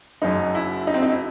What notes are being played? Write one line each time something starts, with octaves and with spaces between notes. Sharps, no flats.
F#1 F#2 F#3 D#4
E4
D#4
C4
D#4
E4